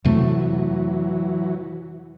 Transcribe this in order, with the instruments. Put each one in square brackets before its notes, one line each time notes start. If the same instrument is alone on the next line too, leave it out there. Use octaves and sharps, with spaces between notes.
[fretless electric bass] F2 C3 A3 [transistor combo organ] E3 F#3